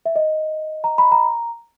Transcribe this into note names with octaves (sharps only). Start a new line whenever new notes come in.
E5
D#5
A#5
B5
A#5